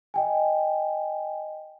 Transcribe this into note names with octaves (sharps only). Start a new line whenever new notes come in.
D#5 G5 G#5